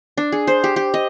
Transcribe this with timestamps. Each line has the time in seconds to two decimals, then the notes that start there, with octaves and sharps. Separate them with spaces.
0.18 D4
0.32 G#4
0.47 C5
0.64 G4
0.76 G4
0.94 D#5